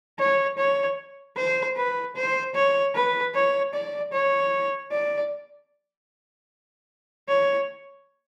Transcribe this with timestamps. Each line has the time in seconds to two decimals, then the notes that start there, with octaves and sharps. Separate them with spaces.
0.19 C#5
0.58 C#5
1.36 C5
1.77 B4
2.16 C5
2.55 C#5
2.95 B4
3.34 C#5
3.73 D5
4.13 C#5
4.92 D5
7.28 C#5